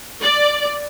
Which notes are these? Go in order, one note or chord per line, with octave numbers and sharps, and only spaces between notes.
D5